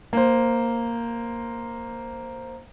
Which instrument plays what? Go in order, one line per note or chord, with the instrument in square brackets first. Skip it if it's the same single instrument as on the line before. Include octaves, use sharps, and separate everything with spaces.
[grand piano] A#3 C5